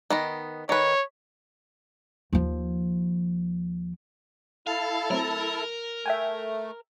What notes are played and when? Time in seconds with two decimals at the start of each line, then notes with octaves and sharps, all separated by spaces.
0.10 D#3 B3 D#5
0.69 D#3 B4 C#5
2.33 D#2 F3
4.67 E4 A4 F5 A5
5.10 F#3 A3 C4 A#4
6.06 A3 E5 G5 G#5